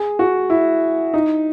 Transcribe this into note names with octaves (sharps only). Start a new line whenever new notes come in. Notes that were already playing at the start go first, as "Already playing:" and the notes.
Already playing: G#4
F#4
E4
D#4